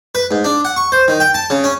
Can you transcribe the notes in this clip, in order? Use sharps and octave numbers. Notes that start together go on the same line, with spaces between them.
B4
G#2
D4
F#5
C#6
C5
D#3
G5
A5
C#3
C#4